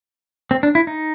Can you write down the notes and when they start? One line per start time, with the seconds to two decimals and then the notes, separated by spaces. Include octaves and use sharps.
0.51 C4
0.63 D4
0.75 E4
0.87 D#4